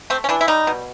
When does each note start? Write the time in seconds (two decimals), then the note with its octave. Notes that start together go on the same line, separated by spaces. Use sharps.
0.10 A3 C4
0.24 C#4
0.29 E3 D4
0.41 E4
0.48 G3 D#4
0.67 B2